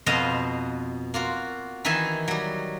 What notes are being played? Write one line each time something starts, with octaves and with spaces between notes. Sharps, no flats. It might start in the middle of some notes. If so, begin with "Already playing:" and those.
F2 B2 B3 C5 D#5 F5
A#3 F4 F#4
D#3 E3 D#4 E5 G#5
F#3 G3